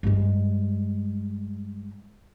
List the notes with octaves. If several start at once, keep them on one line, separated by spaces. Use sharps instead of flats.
G2 G#3